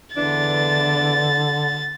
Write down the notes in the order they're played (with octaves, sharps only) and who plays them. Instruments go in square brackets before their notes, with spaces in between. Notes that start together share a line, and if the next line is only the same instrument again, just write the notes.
[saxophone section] E2 E3 D4 [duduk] D3 [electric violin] A6